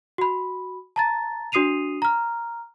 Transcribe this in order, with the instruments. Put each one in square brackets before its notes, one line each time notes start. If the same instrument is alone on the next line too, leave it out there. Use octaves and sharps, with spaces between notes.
[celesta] F#4 B5
A5 A#5 A6
D4 F#4 D#6 C7 D#7 F7
A#5 F6